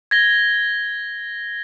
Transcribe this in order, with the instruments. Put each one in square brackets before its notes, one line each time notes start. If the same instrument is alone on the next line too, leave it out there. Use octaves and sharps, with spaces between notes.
[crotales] G#6 A#6 G7